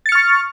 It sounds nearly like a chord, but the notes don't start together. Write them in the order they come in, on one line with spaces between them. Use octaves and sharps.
A6 C#7 F6 C#6